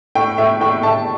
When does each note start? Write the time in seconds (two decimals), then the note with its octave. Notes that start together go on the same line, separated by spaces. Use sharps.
0.15 A2 G5
0.38 A2 E5
0.61 A2 G5
0.83 A2 E5 A5